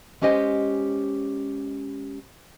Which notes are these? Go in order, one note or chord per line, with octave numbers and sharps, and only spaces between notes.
G#3 C#4 G4 C5 D#5 G#5